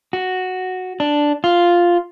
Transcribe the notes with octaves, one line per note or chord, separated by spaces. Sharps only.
F#4
D4
F4